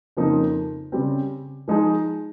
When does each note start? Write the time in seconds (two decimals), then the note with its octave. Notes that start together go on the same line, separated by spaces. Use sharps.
0.17 F2 C#3 F3 A#3 D#4
0.92 C#3 G3 C4
1.68 F3 G#3 D#4 G#4